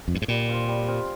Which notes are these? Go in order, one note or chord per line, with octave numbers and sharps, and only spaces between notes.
F2
G2
G#2
A#2 G3
C4 F4 C5
G3
C4 F4 C5